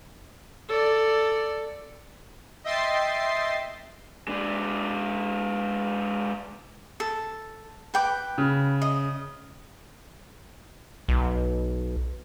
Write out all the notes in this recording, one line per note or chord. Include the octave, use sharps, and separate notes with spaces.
A4 D5
D#5 E5 G5 C6 A6 C7
G#3 D4
A4
B4 G5 D6
C#3
D#5
B1